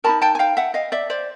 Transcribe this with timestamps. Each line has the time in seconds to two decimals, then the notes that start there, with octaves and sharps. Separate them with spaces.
0.04 D#4 F#4 A#4 A5 B5
0.22 G5 A5
0.35 G#5
0.39 F5 G5
0.57 E5 F#5
0.74 D#5 F5
0.92 D5 E5
1.10 C5 D5